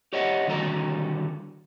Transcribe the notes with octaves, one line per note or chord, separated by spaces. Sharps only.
G4 C#5 D#5 E5 F#5
D3 D#3 G3 F#4 A4 A#5